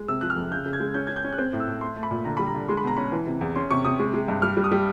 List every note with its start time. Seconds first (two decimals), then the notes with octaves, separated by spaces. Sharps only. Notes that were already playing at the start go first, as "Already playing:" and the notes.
Already playing: G#3
0.08 C3 E6
0.21 F3 F#6
0.30 F6
0.36 F2
0.51 C#3 G6
0.66 C#3
0.73 G#6
0.80 G#3
0.94 C#4 G6
1.07 C#4 G#6
1.16 G6
1.24 C#4
1.33 F#6
1.38 C4 G6
1.53 A2
1.60 E6
1.68 A2
1.81 A3 C6
1.96 A3
2.03 B5
2.11 A#2
2.25 D3 A#5
2.37 G3 B5
2.47 A#5
2.55 D3
2.69 G#3 C6
2.77 B5
2.84 B2 A#5
2.97 C#4 B5
3.12 E3
3.27 C3
3.41 E2
3.56 C#4 C6
3.71 C3 C#6
3.85 C3 D#6
4.00 G#3
4.14 G#3
4.28 G2
4.42 G3 F6
4.57 G3
4.64 D#6
4.72 G3